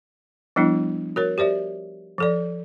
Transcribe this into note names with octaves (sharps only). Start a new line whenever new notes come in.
F3 G3 B3 D4 E4
F#4 A#4 C#5
G4 C5 D5 E5
F3 A4 D5